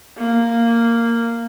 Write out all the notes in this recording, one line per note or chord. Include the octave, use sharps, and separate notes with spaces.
A#3